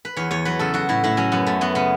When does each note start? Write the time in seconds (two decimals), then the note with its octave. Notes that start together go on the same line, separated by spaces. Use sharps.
0.05 B4
0.17 E2 C#5
0.31 E2 C#5
0.45 F#3 B4
0.59 C#3 A4
0.74 F#3 F#4
0.89 A2 E4
1.04 A2 E4
1.17 F#3 C#4
1.32 F#2 B3
1.47 F#2 A3
1.61 F#3 B3
1.75 C#3 B3